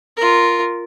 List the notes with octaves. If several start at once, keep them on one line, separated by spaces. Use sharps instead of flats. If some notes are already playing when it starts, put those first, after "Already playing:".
F4 A#4